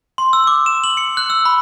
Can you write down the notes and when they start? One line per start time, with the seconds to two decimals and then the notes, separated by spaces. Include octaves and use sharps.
0.18 C6
0.33 E6
0.47 D6
0.66 E7
0.84 F#7
0.97 C#7
1.17 F#6
1.30 E6
1.45 B5